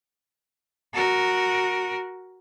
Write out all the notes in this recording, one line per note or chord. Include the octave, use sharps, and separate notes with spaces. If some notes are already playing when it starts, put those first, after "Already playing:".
F#4 A#4